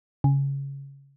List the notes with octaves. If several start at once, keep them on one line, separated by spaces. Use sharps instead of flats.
C#3